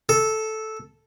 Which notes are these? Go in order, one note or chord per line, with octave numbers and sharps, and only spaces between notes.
A4